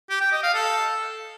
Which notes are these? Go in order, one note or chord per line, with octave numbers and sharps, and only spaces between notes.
G4
G5
D#5
F5
A4